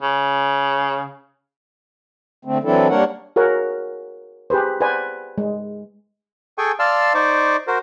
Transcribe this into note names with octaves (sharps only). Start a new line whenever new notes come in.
C#3
D3 A3 C4
E3 F#3 C4 D4 E4 A4
G3 A#3 D4 A#4 C#5 F#5
F#4 G#4 A#4 C#5 F#5
G4 G#4 B4 C5
B4 C5 D5 F#5 G#5
G#3
G#4 A4 G5 G#5 C#6
D5 F5 A5 C6 E6 F6
D#4 C5 D5 C#6 D6
F#4 A#4 C5